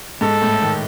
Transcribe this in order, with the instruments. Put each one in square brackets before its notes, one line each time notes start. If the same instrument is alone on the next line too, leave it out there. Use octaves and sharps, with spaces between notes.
[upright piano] G#2 [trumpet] A4
[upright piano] A2
D#3